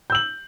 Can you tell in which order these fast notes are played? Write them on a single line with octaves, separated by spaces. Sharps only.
G6 E6 F#7